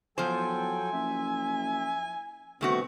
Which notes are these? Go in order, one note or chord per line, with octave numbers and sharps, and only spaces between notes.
E2 F3 F#3 A4 C5 G5 G#5
F#1 E5
G1 B2 D#3 A3 C4 F#4